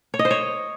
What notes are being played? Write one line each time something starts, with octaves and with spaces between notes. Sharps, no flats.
C#5
D#5
C5
C#5